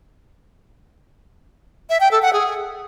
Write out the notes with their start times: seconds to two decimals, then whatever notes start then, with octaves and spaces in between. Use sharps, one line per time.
1.90 E5
2.00 G5
2.11 A4
2.22 F#5
2.33 G#4